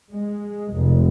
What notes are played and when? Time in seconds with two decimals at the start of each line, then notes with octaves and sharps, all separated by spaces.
0.11 G#3
0.73 F1